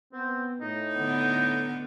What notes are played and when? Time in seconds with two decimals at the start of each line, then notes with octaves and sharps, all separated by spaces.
0.13 B3 C4
0.61 A2 D#4
0.95 D3 B3